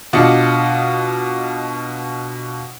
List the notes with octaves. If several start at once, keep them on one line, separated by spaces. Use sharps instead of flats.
B2 D4 F4 D#5 C#7